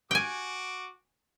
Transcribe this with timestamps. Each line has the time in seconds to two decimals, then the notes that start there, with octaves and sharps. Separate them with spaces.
0.11 F#4 G5 G#5 D6